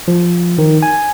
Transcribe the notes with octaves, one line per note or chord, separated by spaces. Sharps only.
F3
D#3
G#5